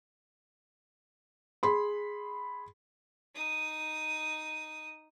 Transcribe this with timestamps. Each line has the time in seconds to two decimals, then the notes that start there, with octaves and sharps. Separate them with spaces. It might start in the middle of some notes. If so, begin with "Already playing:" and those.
1.63 G#4 B5 C6
3.34 D#4 D#6